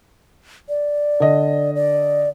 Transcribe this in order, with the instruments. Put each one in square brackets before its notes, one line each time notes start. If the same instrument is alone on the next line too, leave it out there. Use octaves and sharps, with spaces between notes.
[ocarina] D5
[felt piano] D3 D#5
[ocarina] D5